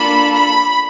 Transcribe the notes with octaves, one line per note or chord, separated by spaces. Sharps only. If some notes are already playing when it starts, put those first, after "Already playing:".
Already playing: A#3 D4 F4 A4 B5
B5